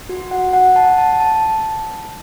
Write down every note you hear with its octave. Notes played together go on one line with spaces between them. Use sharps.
F#4
F#5
F#5
A5
A5
A5